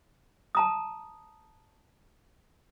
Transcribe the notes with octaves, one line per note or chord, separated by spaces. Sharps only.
A5 A#5 D#6